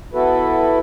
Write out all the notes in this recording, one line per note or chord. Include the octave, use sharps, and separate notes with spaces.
B3 E4 F#4 A4 B4